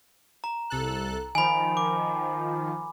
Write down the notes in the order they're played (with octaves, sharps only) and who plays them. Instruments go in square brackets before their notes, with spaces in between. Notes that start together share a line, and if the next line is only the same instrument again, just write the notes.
[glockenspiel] A#5
[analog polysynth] C2 A4 F#6
[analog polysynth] D#3 F3 [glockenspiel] G#5 B5
[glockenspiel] D6